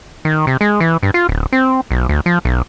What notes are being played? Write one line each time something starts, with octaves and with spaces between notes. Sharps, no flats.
D#3
C3
G#3
E3
G2
F4
D1
C4
B1
D2
F3
B1